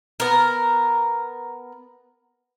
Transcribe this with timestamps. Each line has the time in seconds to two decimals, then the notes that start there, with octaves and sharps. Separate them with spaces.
0.20 B3 A#4